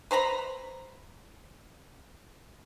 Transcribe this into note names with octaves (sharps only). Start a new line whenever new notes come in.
B4 C5 A#5 B5